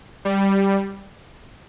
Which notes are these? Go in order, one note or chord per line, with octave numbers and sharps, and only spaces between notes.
G3